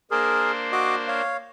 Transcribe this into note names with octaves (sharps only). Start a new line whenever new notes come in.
A#3 D4 G#4 A#4 C5
F#4 D#5 D6
C#5 F5